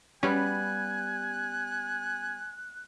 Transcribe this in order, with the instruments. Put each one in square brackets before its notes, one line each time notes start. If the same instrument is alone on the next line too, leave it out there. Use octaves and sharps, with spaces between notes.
[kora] G3 B3 [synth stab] C#4 [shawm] G#5 [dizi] F#6